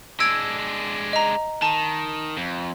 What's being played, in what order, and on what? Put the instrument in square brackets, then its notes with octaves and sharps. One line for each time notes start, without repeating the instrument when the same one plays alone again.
[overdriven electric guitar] G#3 D4 [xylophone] E6 G#6 D7
[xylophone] D#5 A#5
[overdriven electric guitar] D#3 [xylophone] A5
[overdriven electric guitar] F2